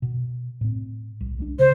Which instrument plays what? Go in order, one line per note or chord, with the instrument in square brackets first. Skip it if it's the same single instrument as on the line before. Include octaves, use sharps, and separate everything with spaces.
[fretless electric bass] B2
A2 C4
C2
C#2 F3 D4
[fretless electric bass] C#3 [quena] C5